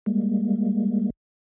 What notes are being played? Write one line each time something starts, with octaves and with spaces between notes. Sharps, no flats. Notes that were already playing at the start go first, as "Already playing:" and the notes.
G3 G#3 A#3